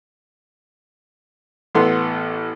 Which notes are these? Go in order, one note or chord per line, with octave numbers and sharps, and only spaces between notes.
A1 B3 A4 C6